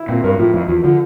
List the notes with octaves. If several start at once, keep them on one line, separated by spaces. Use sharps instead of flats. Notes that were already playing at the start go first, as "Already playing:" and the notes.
Already playing: E4
A#2 C4
G2 A#4
A2 F3
F2 E4
E2 F3
D3 F3